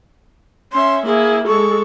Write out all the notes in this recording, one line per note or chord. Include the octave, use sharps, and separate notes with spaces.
C#4 E5 C6
A#3 E4 G#4
G#3 A4 C#6